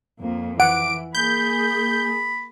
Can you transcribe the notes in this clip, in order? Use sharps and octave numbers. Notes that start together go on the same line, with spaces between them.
F2 A#3
E3 F#5 D6 D7
A#3 G#4 B5 G6